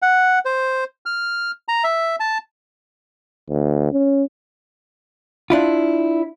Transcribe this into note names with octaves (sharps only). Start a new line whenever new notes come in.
F#5
C5
F6
A#5
E5
A5
D2
C#4
D4 E4 F4